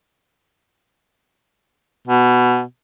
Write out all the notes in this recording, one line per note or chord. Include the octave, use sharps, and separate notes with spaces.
B2